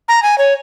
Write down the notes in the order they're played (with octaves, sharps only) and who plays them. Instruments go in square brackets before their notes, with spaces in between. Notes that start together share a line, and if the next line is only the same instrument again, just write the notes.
[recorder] A#5
G#5
C#5